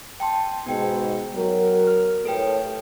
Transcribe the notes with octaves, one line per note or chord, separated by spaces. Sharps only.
G5 A5 C6
G#2 B2 B3 G5
F#3 A#4
F6
A2 G4 A4 B4 C#5 G5